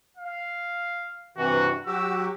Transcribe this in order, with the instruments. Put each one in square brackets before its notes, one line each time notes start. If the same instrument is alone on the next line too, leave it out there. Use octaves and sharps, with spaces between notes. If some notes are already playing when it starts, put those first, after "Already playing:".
[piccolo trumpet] F5
[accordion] G2 C3 E3 [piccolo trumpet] F#4
[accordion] F#3 F#4 G4 [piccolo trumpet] E6